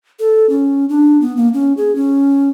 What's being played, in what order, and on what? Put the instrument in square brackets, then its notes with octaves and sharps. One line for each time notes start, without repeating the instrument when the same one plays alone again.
[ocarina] A4
C#4
D4
B3
A#3
C#4
G#4
C#4